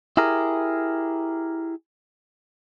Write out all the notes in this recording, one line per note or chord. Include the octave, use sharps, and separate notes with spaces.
E4 G4 G#4 A#4